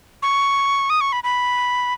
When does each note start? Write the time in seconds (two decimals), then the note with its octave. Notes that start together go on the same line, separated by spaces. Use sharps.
0.22 C#6
0.90 D#6
1.01 C#6
1.12 B5
1.24 B5